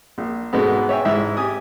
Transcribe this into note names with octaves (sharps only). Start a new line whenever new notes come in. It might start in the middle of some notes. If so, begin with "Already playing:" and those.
A#1
G#2 B2 G#3 A3 B3
C#5 E5 G5 G#5
A1 G#2 E4 E5
G4 G#5 D#6